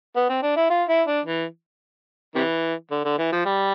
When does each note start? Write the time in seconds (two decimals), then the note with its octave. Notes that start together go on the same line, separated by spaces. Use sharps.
0.16 B3
0.29 C4
0.43 D4
0.57 E4
0.70 F4
0.89 E4
1.07 D4
1.25 E3
2.35 C3 E3
2.91 D3
3.05 D3
3.18 E3
3.32 F3
3.46 G3